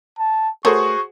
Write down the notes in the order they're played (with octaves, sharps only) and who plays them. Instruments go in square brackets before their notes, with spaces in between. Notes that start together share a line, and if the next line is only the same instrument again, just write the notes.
[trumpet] A5
[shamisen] A3 A#4 C#5 [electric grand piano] F#4 G#4 C5 [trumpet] C#6